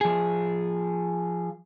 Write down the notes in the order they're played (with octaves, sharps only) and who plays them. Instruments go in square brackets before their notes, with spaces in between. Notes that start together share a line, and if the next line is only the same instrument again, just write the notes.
[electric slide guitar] F3 G#4